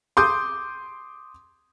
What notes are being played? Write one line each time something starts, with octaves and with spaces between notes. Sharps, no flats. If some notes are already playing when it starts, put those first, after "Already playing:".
C6 D6 D#6 G6